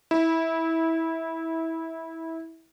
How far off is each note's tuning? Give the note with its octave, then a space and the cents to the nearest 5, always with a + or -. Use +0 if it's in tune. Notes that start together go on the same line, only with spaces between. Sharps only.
E4 -20